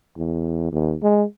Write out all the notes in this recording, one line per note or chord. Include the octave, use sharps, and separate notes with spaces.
E2
D#2
G#3